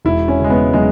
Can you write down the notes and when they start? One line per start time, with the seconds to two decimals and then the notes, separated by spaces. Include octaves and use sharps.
0.05 E1 E4
0.28 C#4
0.39 C#3 G#3
0.50 B3
0.73 F#3 G#3